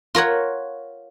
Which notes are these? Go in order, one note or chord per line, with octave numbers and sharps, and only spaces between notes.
F4 A#4 C#5 F#5